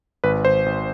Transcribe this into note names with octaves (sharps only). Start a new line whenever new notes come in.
G#1 B4
G#1 C5
G#1